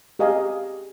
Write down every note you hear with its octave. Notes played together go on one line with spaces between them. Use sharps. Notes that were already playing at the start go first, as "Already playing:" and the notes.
G4 G#4 D#5 F5 G#5